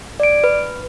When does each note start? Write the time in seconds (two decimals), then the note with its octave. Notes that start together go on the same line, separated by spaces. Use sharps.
0.20 D5 D7
0.44 B4